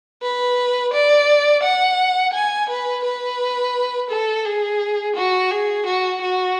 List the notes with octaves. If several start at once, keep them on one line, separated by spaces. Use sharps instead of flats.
B4
D5
F#5
G#5
B4
B4
A4
G#4
F#4
G#4
F#4
F#4